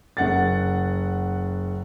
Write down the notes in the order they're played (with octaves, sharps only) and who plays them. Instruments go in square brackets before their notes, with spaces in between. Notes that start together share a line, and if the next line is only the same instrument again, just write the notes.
[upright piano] F#1 F#5 A6